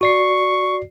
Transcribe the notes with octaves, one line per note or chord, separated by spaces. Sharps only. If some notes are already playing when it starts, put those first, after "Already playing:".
F#4 D5 C#6 C7